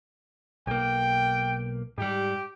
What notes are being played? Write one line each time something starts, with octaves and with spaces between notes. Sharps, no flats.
B1 A#3 G5
G#2 G3 G4